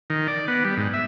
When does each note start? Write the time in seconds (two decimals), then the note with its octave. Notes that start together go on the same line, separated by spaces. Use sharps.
0.10 D#3
0.28 D5
0.48 B3
0.65 G3
0.77 G#2
0.94 E5